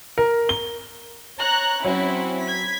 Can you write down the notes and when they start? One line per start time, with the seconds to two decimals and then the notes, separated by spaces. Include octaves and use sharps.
0.18 A#4
0.49 G7
1.38 C#5 A#5 F#6
1.84 F#3 C4 C#4 E4
2.44 G#6 B6